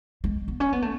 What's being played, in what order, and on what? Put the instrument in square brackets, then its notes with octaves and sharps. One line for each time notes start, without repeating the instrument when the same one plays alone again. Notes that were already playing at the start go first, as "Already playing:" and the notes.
[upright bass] G#3
B3
C#4
B3
A3